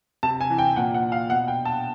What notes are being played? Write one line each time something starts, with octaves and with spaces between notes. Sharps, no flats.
C3 A5
G#5
E3
G5
A#2 F#5
F#5
F5
B2 F#5
G5
A5